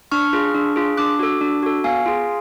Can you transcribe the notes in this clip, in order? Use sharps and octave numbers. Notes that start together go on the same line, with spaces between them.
D4 C#6 F6
F4 G#4
D4
F4 G#4
D4 D6 F#6
F#4 A4
D4
F#4 A4
B3 F5 G#5
F4 G#4